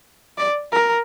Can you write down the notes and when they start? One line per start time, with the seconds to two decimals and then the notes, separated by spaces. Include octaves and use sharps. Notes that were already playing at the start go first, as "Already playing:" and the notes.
0.38 D5
0.72 A#4